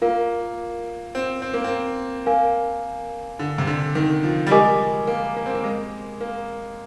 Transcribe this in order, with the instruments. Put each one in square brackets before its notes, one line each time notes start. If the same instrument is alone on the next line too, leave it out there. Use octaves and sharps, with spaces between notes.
[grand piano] A#3 [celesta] F4 A#4 F5
[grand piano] C4
C4
A#3
C4
[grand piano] A#3 [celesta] A#4 F5 G#5
[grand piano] D3
C3
D3
D#3
F3
G3
[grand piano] G#3 [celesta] G4 A#4 D#5 G#5 D6
[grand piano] A#3
A#3
C4
A#3
G#3
A#3